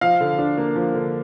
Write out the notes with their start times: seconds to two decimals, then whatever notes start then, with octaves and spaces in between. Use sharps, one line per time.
0.01 F3 F5
0.20 D3
0.39 D4
0.57 A#3
0.76 F3
0.94 D3